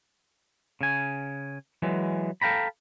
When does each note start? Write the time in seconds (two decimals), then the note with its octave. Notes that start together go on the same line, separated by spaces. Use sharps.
0.81 C#3 G#5
1.82 E3 F#3 G#3
2.42 A4 F5 G5 A#5 B5